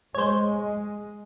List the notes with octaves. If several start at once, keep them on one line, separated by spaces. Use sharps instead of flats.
G#3 C5 C#5